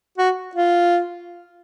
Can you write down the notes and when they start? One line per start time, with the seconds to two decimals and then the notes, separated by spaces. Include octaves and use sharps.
0.18 F#4
0.55 F4